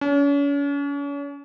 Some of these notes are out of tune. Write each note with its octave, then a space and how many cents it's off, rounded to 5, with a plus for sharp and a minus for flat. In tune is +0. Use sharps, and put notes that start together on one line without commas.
C#4 +40